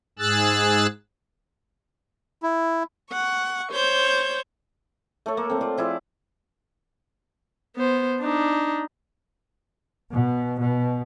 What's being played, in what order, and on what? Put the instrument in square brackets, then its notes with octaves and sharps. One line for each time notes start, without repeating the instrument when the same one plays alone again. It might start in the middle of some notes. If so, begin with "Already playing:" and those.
[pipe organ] G#2 G#4 E6 F#6 A6
[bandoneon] E4
[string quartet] F#5 C#6
C5 C#5 G6
[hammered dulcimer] A3 A4 C#5
A#3
A3 C4
F4 D5
F3 E4 G#4 D5
[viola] B3 C5
D4 D#4
[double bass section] B2
B2